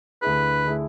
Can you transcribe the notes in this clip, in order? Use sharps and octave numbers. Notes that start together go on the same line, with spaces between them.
D2 D3 A3 E4 G#4 B4
D3 A3 E4 G#4